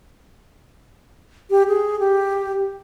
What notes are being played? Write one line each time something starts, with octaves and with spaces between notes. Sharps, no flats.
G4
G#4
G4